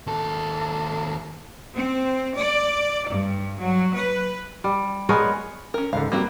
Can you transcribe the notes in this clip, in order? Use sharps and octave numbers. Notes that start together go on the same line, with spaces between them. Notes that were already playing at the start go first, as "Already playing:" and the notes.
D#2 A4
C4
D5
G2
F#3
B4
G3
G#3 B3 A#4 C#5
C#4 A#4
C#2 G#2 D3 F5
G3 A#3 C4 F#4 B4